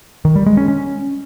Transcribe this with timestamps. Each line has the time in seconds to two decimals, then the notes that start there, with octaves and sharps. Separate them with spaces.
0.25 D#3
0.36 G3
0.46 G#3
0.57 C#4
0.68 C#4